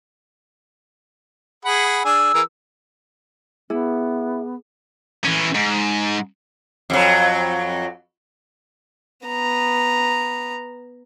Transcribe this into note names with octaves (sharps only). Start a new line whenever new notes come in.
G#4 F#5 B5
D4 G#4 G#5 E6
E3 G#4 A#4
B3 E4 G#4
E3 C#4
G#2
F2 F#3
B3 A#5